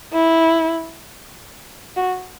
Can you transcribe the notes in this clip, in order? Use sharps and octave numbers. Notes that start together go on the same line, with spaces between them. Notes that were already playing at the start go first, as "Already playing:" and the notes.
E4
F#4